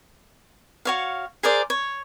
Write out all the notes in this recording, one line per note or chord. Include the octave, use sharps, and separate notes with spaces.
F#4 C#5 F5
G#4 A#4 C5 D5
C#5